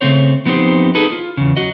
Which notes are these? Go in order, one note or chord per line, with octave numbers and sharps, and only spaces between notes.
C#3 A3 B3 C4 C5 C#5
F3 B3 C4 D#4 G4 C5
D#4 G#4 A4 B4
F4
E2 C#3
F#3 F#4 D#5